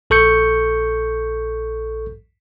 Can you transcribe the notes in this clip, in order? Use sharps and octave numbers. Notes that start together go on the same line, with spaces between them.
A#1 A4 C#6 G6 C#7